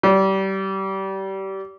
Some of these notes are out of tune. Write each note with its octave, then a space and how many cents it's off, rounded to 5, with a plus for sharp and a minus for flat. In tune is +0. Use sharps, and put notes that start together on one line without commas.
G3 -25